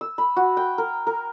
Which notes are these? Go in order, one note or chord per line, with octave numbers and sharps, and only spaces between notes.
E6
B5
F#4
G5
A#4
A#4